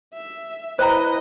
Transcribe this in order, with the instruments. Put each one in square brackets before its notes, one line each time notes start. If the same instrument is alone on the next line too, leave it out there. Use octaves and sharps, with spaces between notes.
[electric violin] E5
[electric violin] E4 D#5 [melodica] B4 [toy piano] C5 G5 A#5